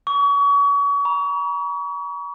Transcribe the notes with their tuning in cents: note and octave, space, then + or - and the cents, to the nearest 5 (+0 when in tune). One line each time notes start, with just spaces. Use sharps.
C#6 +35
A#5 +45